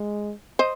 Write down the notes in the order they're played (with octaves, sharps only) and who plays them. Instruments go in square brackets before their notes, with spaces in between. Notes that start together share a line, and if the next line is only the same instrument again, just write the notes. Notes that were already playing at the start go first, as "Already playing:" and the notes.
Already playing: [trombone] G#3
[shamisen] C5 D#5